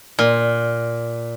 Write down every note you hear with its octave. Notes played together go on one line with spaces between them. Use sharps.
A#2